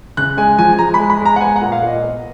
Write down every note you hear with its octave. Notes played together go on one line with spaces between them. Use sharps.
C#3 F#6
G#3 G#5
F3 G#5
G#5
G#3 A#5
B5
G#3
B5
G#3 A#5
F#5
B3 G#5
F#5
A#2
F5
A#2 D#5
B3